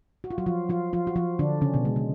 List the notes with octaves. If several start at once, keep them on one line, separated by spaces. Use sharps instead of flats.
F#4
F4
F#3 F#4
F3 F4
F3 F4
F3 F4
F#4
F3 F4
D3 D4
C#3 C#4
B2 B3
G#3
G#3